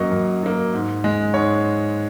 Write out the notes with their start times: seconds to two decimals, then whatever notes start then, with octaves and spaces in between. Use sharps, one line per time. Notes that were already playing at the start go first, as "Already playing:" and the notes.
Already playing: F#2 F#3 A#3 D#5 C#6
0.11 F#2
0.43 F#3 A#3
0.74 G#2
1.04 G#3
1.34 G#2 C#5